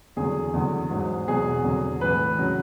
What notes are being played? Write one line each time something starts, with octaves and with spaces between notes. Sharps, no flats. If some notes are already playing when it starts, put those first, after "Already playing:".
E2 D3 F#3 G#4
E2 D3 F#3
G#2 F#3
E2 B2 F#3 G#4
E2 D3 F#3
A2 E3 B4
C#3 F#3